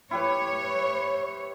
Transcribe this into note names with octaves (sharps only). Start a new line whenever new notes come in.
E4 G4 B4 C#5